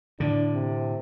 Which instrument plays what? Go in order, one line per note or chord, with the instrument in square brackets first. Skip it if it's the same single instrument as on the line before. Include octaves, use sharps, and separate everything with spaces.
[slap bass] A2 D3 [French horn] D4
[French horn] C3